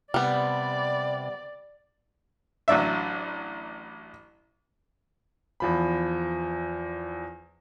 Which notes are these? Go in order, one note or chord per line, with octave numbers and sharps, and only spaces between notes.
C3 G3 B3 D5
A1 F#3 D4 E5
E2 F3 B5